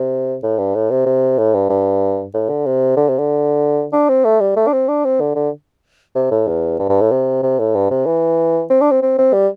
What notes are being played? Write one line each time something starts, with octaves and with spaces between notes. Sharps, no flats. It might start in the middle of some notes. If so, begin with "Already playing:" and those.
Already playing: C3
A2
G2
A2
C3
C3
A2
G2
G2
A2
D3
C3
D3
C3
D3
D4
C4
A3
G3
A3
D4
C4
D4
C4
D3
D3
C3
A2
E2
G2
G2
A2
C3
C3
A2
G2
C3
E3
C4
D4
C4
C4
C4
G3